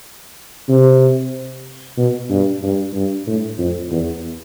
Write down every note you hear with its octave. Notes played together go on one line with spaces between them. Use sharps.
C3
B2
G2
G2
G2
A2
F2
E2